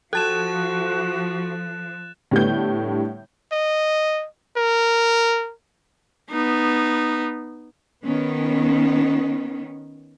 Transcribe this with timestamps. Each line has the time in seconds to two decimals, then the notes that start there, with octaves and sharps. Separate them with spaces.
0.13 F3 F#4 A4 A5 F#6 A6 E7
2.31 A2 D3 G3 A3 B3 G6
3.52 D#5
4.57 A#4
6.31 B3 D#4
8.03 D#3 B3 C#4